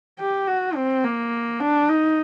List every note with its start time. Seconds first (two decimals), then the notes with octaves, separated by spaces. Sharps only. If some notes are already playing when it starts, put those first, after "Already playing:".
0.19 G4
0.47 F#4
0.76 C4
1.04 A#3
1.60 D4
1.89 D#4